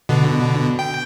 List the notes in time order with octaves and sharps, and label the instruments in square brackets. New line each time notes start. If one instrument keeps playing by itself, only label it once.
[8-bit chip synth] B2 D3
G5